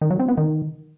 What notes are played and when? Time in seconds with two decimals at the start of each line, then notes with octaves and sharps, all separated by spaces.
0.01 D#3
0.10 F#3
0.19 C4
0.28 B3
0.37 D#3